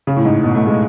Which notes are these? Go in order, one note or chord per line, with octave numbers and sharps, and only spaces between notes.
C#3
A2
G#2
B2
A3
G#3